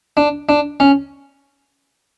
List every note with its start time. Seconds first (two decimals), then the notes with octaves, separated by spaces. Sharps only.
0.17 D4
0.49 D4
0.80 C#4